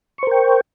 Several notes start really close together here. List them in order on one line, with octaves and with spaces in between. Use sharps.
C#6 C5 A#4 G5